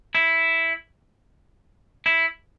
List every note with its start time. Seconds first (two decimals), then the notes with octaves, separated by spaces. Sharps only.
0.15 E4
2.06 E4